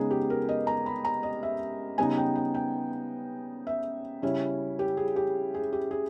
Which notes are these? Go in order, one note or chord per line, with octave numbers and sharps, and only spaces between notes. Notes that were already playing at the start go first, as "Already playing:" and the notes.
Already playing: C#3 G#3 B3 D#4 G#4
G4
A#4
D#5
A#5
B5
A#5
D#5
E5
C#3 G3 B3 D#4 G#5
G5
G5
G5
E5
C#3 G3 C#4 E4
G4
G#4
G4
G#4
G4
G#4